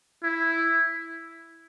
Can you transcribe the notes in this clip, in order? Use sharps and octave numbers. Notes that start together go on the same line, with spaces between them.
E4